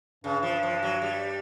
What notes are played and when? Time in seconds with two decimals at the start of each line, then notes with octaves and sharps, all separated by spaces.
0.24 G2 C#3
0.43 F3
0.63 F3
0.83 F#3
1.02 G3